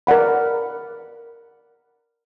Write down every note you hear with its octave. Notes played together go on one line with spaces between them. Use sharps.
A#4 D5 F#5 B5